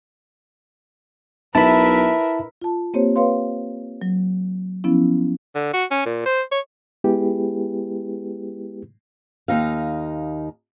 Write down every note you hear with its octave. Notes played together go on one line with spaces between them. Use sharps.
B1 E4 A#4 B4 E5 A5 B5
F4 A5
A#3 C4 G4 C5 C#5
B4 C#5 F5 C6
F#3
F3 B3 C#4 E4
D3
F#4
C#4
A#2
C5
C#5
G#3 B3 E4 G4 G#4 B4
D#2 D#4 F5